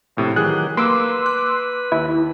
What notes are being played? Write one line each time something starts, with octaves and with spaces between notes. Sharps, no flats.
A#1 A2 C3
D#3 E3 F#3 G4 G#4 F#6
A#3 B4 C6 D6 E6
F#6
D#2 E4